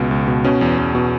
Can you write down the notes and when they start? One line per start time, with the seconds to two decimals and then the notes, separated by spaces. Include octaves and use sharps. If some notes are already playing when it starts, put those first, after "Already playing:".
Already playing: C#2 B2
0.11 C#2
0.28 B2
0.44 B2 C#4
0.61 E2
0.79 E2
0.95 B2